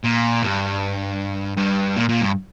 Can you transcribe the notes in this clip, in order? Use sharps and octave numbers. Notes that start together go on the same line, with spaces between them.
A#2
G2
G2
A#2
A#2
G2